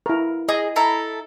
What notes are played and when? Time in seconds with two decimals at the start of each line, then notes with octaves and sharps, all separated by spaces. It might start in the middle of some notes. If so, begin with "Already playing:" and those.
0.06 E4 A#4
0.49 G#4 D#5
0.76 E4 A4 A#5